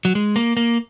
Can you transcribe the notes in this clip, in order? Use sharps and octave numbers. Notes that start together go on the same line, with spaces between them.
F#3
G#3
A#3
A#3